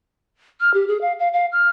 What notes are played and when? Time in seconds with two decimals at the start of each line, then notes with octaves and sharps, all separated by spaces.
0.60 F6
0.74 G4
0.88 G#4
1.01 F5
1.19 F5
1.33 F5
1.52 F6